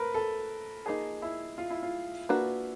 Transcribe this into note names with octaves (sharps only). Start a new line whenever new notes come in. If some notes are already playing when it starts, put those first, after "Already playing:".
Already playing: A3 C4 A#4 B4
A4
F3 A#3 D#4 G#4
E4
F4
E4
F4
A#3 D4 F#4 B4